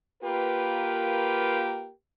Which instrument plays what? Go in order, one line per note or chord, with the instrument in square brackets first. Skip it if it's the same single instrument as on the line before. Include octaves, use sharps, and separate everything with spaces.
[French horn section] A#3 F4 G4 A#4 B4